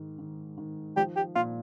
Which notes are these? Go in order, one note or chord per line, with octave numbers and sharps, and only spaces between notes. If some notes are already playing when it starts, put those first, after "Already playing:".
Already playing: G#2 D#3
D#3
D#3
F3 G4
G4
A#2 F4